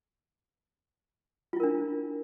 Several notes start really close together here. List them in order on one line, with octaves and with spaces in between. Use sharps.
F4 E4 A#4 D4